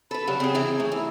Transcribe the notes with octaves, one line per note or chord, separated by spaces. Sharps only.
A4 B4 B5
C#3 F#3 G3
C#3 C4 G#4
C3 E3 A#5
A3
D2 E4